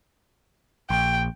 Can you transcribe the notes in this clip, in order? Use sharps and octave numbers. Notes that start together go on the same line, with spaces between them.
A#1 G5